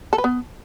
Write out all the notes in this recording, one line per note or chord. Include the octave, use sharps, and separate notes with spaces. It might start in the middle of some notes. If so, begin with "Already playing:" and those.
A4
B4
B3